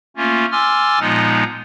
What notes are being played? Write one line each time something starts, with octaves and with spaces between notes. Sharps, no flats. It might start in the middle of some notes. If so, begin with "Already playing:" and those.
A3 A#3 C#4 F4
G#5 C6 D6 E6 F6 A6
A#2 F3 G#3 B3 D#4